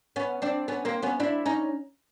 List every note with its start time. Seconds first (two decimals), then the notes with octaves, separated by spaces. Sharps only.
0.16 B3 C#4
0.42 C4 D4
0.68 B3 C#4
0.85 A#3 C4
1.02 B3 C#4
1.20 D4 E4
1.45 C#4 D#4